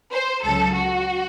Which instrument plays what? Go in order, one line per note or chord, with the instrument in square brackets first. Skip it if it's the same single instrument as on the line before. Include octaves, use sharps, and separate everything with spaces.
[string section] C5
C#2 C#3 F#3 A4
F#4